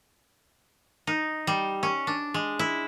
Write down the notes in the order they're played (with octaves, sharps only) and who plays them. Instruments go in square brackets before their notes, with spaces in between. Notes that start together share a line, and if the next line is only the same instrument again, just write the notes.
[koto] D#4
G3
C#4
D4
G#3
E4